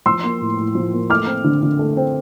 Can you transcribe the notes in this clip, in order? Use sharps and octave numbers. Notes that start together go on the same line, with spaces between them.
F3 C6 E6
A#3
A2
A2
F3
A#3
A3 D6 F6
C4
D3
D3
A3
C4